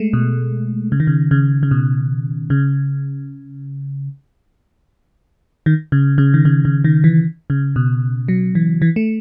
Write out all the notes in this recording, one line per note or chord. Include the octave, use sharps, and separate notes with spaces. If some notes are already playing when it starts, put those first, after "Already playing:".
Already playing: G#3 A3
B2
C#3
D#3
C#3
C#3
C#3
B2
C#3
D#3
C#3
C#3
D#3
C#3
C#3
D#3
E3
C#3
B2
F#3
E3
E3
A3